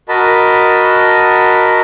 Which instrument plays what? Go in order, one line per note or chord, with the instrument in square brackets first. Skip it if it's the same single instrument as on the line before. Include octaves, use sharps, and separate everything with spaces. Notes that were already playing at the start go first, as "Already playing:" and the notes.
[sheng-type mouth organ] F#4 A#4 D#5 A5 B5